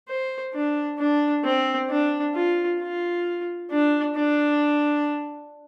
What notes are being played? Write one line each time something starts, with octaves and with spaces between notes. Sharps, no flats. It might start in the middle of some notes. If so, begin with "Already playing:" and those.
C5
D4
D4
C4
D4
F4
F4
D4
D4